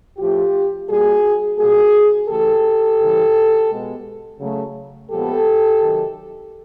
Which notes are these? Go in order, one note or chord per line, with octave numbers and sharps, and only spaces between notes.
A2 F3 A3 F4 G4
A#2 G3 A#3 F#4 G#4
A#2 G3 A#3 F#4 G#4
C#3 E3 A3 G4 A4
C#3 E3 G3
B2 G#3 B3
C#3 F#3 A3
A#2 F3 G#3 B3 G4 A4
C3 D#3 F#3